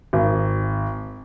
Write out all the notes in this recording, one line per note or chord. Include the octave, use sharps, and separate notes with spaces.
G#1